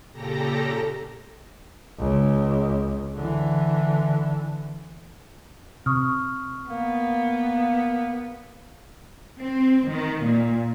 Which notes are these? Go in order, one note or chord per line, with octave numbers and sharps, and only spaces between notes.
A#2 C#3 G4 A4 A#5 A#6
C#2
D3 E3
C3 C#6 D#6 F6
A#3 B3
C4
D#3
A#2